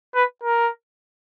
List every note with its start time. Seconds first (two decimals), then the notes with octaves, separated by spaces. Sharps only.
0.15 B4
0.44 A#4